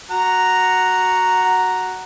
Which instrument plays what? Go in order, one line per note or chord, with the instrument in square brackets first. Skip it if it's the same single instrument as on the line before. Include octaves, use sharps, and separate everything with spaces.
[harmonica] F#4 F#5 A#5